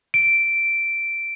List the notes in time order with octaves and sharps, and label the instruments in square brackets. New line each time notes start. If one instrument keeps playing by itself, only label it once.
[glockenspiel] D7